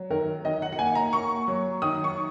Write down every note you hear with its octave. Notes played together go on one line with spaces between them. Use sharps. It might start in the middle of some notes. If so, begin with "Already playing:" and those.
Already playing: F#3
D#3 A#4
D#3 D#5
F#5
F#5
A#3 G#5
A#5
A#3 C#6
F#3
D#3 D#6
C#6